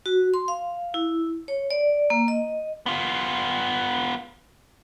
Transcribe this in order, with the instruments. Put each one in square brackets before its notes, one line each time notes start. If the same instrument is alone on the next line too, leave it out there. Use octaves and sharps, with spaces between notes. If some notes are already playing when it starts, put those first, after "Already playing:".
[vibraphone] F#4
C6
F5
E4
C#5
D5
A#3
D#5
[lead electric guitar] B3 F4